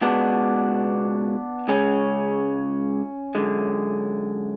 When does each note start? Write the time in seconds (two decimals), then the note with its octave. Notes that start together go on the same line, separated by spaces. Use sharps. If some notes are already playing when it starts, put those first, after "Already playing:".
0.01 C#2 B2 G#3 B3 D4
1.68 C#2 C#3 G#3 C#4
3.35 F#2 D3 G#3